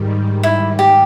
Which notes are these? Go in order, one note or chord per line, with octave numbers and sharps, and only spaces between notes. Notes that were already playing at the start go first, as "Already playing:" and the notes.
Already playing: G#2 D#3 G3
E4
G4